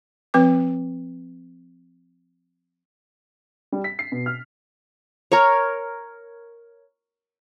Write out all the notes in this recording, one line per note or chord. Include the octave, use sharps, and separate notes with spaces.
F3 C4 B4 D6
G3
B6
C7
B2
F6
A#4 C#5